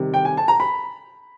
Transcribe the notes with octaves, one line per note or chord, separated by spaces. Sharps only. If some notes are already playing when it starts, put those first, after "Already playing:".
Already playing: C3 D#3 G3
G5
G#5
A5
A#5
B5